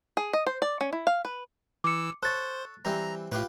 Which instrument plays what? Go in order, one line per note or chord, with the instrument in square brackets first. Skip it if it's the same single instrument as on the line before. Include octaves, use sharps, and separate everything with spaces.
[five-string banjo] G#4
D#5
C5
D5
C#4
E4
F5
B4
[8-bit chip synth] E3 E6 [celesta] D6 C#7
[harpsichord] A4 C#5 [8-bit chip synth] C5 [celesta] F#6 A6
[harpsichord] E3 G3 C4 [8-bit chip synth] A#5
[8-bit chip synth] A2 [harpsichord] F4 G4 B4